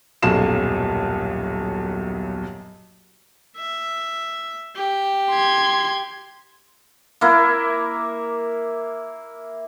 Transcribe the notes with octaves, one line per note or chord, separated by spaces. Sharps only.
D#1 B1 F#2 F#3 F5 E7
E5
G4
C6 G#6
A#3 E4